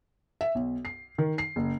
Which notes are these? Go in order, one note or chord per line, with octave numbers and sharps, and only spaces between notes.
E5
B1
C7
D#3
C7
F#1